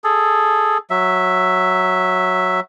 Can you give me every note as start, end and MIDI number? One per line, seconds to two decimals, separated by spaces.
0.04 0.78 68
0.04 0.78 69
0.90 2.60 54
0.90 2.60 76